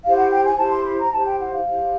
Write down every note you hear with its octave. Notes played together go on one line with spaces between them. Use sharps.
E4 G4 C5 F5
F#5
G5
G#5
E4 G4 C5 A5
C6
B5
A#5
E4 G4 C5 A5
G5
F#5
F5
E4 G4 C5